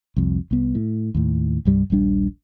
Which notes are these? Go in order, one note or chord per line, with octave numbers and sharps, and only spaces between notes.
C2 F2
C2 B3
A2
D#2 A2
C2 G2 G3
D#1 A#1 G3 D4